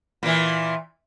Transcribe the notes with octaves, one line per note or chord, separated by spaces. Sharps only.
A#2 E3